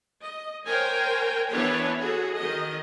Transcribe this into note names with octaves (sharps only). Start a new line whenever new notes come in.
D#5
A#4 C5 C#5 G5 G#5
E3 B3 D4 B4 C#5 A5
F#4 G#4 A4
D#3 D#5